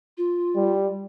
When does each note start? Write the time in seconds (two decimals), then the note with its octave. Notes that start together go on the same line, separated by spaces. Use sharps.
0.18 F4
0.56 G3